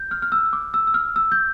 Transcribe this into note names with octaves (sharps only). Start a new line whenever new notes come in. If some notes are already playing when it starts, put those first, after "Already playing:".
Already playing: G6
F6
F6
E6
D6
E6
E6
F6
E6
G6